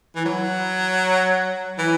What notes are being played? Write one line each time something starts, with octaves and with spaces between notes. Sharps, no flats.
E3
F#3
E3